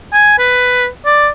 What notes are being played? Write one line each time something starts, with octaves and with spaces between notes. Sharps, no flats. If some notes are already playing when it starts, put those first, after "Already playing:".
G#5
B4
D5